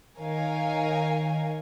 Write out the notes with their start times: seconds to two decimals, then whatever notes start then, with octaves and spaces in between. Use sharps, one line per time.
0.17 D#3 D#4 A#4 C#5 F5 G#5